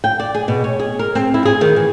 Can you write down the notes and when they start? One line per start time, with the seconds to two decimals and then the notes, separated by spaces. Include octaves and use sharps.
0.04 G5
0.20 D5
0.35 G#4
0.48 B2
0.64 C#5
0.80 G#4
0.99 A#4
1.15 C4
1.34 E4
1.45 G#4
1.61 D#3
1.76 E3